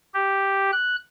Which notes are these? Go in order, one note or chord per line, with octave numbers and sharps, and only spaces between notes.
G4
F#6